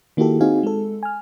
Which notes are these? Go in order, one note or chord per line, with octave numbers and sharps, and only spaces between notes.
D#3 A#3 E4 F#4 G4 A4
C4 D#4 F#4 G#4 F5 G#5
G#3 A4
G#5 F6